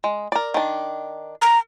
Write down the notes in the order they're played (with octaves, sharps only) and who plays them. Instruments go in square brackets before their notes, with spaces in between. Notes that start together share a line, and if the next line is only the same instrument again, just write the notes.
[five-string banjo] G#3
A#4 D5
D#3 D4
[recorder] A#5